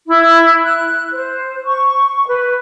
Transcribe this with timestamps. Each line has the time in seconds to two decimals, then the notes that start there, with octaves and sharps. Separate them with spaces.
0.07 E4
0.62 F#6
1.13 C5
1.65 C#6
2.27 B4